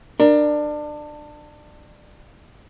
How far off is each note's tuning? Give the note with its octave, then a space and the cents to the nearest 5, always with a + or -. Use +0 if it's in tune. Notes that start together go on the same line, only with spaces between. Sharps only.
D4 +25 A#4 +0